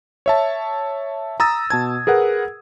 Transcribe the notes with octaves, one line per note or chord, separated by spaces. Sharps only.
C#5 E5 A5
A#5 D#6 E6 A6
B2 A5 G#6
G#4 A#4 B4 F#5